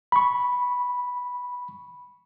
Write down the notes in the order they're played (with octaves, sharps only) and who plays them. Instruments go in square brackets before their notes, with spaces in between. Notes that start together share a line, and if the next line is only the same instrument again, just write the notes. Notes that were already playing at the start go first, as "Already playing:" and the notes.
[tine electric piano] B5 C#6